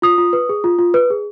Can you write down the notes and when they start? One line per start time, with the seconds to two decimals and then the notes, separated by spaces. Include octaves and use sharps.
0.02 F4 D#6
0.18 F4
0.33 B4
0.49 G#4
0.64 F4
0.79 F4
0.94 B4
1.10 G#4